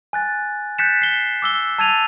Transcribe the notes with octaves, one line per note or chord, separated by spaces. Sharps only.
G#5 F#6 A6
F#6 G6 A6 B6 C#7 E7
C7 G7
D6 E6 G7
A5 E6 G#6 A6 D#7 F7